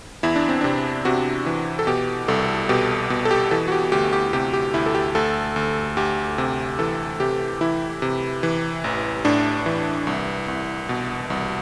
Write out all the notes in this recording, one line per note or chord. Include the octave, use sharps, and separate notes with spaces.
E2 E4
D4
C4
C3 D4
C3 F#4
E3
A4
B2 G4
C2 A4
B2 G4
B2
A4
G4
E3 A4
F#4
G4
D2 G4
G4
C3 G4
G4
D2 E4
A4
G4
D2 A4
D2
D2 G4
C3
E3 A4
C3 G4
E3 E4
C3
E3
A1
A2 D4
E3
C2
C2
B2
C2